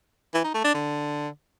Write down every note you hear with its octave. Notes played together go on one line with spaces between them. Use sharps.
E3
D#4
A3
D4
D3